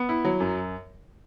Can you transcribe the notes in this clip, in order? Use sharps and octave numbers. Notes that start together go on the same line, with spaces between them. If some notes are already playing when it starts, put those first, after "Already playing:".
Already playing: B3
E4
F#3
F#2